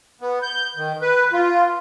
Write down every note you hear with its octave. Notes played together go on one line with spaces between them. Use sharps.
B3
G6
D#3
B4
F4